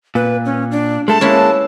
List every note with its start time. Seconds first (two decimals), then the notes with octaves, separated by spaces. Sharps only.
0.15 A#2 B4
0.45 C#4
0.72 D4
1.08 G#3 A3 A4 A5
1.21 G#3 A#3 C#4 E4 B4